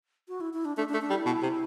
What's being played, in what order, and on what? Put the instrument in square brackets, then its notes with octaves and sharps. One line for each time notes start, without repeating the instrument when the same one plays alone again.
[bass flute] F#4
E4
E4
D4
[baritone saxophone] A3 [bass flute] D4
[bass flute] D4
[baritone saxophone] A3
[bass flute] D4
[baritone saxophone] G3
[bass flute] E4
[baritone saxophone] B2
C3